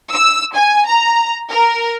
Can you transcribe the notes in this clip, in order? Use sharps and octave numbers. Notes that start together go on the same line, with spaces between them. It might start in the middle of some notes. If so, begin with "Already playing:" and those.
E6
G#5
A#5
A#4